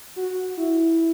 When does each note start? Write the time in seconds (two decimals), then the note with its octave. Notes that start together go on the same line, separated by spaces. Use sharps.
0.16 F#4
0.57 E4